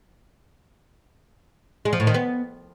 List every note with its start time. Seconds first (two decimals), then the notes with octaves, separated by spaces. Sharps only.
1.85 G#3
1.93 F3
2.00 A2
2.07 D#3
2.14 B3